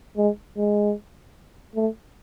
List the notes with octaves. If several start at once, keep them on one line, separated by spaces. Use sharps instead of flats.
G#3
G#3
A3